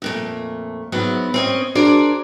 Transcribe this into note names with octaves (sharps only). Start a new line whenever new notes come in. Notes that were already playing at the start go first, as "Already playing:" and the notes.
F2 A#2 A3
G#2 F#3 B3 E4
C4 C#4 D#5
D4 F#4 G#4 A#4 C5 D5